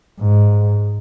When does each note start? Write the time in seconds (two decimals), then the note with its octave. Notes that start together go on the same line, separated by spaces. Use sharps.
0.20 G#2